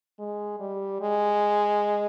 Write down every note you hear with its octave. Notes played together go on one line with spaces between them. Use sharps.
G#3
G3
G#3